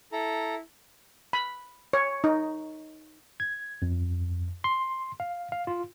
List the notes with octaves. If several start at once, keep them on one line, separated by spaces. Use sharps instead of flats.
E4 A4 A#5
B5
C#5
D#4
G#6
F2
C6
F5
F5
F4